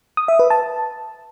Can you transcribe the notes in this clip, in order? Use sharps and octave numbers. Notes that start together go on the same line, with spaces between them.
D#6
E5
B4
A5